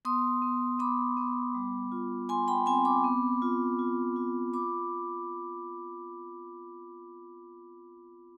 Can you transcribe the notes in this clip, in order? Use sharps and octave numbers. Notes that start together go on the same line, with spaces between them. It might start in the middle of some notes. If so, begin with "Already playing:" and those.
B3 C6 D#6
B3
B3 B5 D6
B3
G3
F4
F4 G#5 C6
G5 B5
C4 G#5 C6
B5 D6
B3
F4
F4
F4
F4 B5 D6